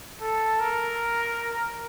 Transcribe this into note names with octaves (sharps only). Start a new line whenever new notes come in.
A4
A#4